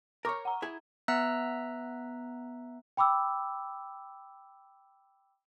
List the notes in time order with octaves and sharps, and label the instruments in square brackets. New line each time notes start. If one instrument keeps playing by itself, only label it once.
[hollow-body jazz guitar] A#4 C#5 [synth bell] C#6 D6 F6
[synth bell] F#5 A#5
[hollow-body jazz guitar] E4 G#4 G#5
[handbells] B3 E5 A#5 E6 F#6
[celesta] G5 B5 D6 E6